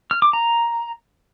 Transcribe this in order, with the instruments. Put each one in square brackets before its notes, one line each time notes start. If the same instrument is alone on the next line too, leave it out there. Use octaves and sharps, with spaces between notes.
[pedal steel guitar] F6
D6
A#5